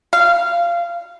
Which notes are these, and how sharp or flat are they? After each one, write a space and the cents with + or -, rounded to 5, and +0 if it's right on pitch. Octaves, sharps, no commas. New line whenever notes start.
F5 -20